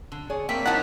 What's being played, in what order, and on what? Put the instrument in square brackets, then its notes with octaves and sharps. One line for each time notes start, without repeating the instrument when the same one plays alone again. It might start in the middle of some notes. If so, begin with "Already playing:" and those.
[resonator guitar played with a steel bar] D3
G#4 C#5 D5
[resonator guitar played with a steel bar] A3 D5 G5 [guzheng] A#3 C4 [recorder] B6
[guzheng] F#3 D#4 A#5 [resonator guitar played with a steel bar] E4 [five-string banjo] F#5 A5